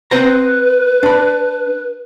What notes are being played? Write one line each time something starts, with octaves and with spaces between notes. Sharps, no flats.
C4 B4 C5 A#5
D4 B5